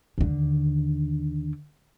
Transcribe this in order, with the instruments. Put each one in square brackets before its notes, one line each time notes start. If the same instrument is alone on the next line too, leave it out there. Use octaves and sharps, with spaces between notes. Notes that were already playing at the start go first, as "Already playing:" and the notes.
[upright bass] D#2 D3